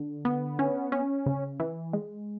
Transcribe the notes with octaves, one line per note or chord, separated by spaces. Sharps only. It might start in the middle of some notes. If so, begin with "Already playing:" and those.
Already playing: D3
B3
C#4
C#4
C#3
E3
G#3